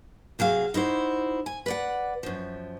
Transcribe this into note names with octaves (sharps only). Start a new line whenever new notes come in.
C3 F#3 G#4 F5
D#4 E4 F#4 C5
G#5
B4 D5 F#5
F#2 F3